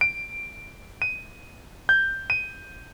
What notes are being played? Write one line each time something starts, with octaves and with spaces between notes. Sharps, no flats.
D7
D#7
G6
D#7